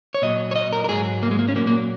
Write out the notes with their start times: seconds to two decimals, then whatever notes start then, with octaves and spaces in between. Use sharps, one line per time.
0.14 C#5
0.22 A#2 F#3 D#5
0.51 C#5
0.56 D#5
0.73 A#4
0.84 A#4
0.89 G#2 F#3 G#4
1.23 A#3
1.31 G#3
1.39 A#3
1.48 C#4
1.56 A#2 F#3 A#3
1.67 A#3